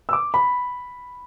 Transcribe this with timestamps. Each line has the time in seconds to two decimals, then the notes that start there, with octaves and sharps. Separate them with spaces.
0.09 E6
0.13 D6
0.34 B5